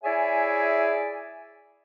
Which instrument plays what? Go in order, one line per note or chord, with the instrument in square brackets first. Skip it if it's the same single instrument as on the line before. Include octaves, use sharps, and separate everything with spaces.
[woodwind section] E4 G#4 C#5 D5 E5 G#5